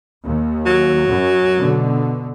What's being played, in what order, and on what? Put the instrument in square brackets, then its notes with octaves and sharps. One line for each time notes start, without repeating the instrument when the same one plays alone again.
[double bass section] D#2
[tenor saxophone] F#3
[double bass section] F#2
B2 D3